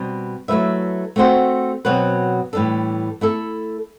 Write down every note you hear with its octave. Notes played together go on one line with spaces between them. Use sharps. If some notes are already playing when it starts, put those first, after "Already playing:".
Already playing: B2 G3 C4
F#3 A3 E4 B4 E5
A3 C4 F#4 C5
B2 F#3 C4 F#4 B4
A2 E3 G3 D4 A4
A3 E4 A4